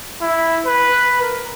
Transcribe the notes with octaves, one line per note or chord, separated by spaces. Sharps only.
E4
B4
A#4